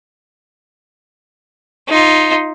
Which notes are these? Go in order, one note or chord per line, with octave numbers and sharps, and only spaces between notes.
D#4 F4